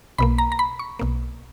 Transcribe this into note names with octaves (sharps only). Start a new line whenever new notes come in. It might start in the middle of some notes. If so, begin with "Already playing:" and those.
B1 B2 A#3 B5
A#5
A#5
B5
C#6
B1 B2 A#3